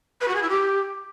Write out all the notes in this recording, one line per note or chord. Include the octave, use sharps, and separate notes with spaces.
B4
F#4
G#4
E4
G4